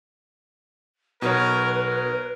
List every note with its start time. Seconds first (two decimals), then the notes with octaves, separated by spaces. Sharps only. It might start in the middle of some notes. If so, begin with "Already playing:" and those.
1.22 B1 B2 A#4 B4 C#5
1.71 A#4